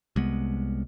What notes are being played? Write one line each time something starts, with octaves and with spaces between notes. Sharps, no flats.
C2 G#3 B3